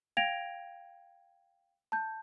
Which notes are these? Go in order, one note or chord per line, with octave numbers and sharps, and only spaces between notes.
F5 G5 G#6 A#6 D7 F7
A5 G6